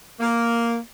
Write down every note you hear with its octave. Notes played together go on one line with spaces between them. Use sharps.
A#3